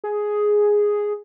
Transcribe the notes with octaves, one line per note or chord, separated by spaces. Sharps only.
G#4